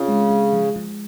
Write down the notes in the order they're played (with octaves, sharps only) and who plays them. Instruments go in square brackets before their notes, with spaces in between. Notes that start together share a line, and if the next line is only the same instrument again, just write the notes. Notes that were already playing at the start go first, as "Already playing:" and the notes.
Already playing: [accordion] C#3 [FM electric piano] C4 F4
[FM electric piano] G#3
G#3
F3
F3